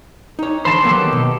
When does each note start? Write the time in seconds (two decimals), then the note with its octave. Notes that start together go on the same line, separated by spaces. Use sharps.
0.39 D#4 C#5
0.65 D3 E3 C5 A5 B5 C6
0.84 D#3 F#3 A#3 B3 G4 A4
1.13 B2